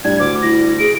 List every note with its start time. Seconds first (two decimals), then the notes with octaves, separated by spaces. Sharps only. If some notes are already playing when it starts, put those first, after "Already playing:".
0.04 A2 G3 D4 G#6
0.20 D2 D6
0.42 E4 A#6
0.79 G#4 D7